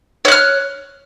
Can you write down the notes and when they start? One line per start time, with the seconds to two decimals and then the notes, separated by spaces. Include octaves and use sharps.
0.25 C#5
0.28 F#6
0.31 F6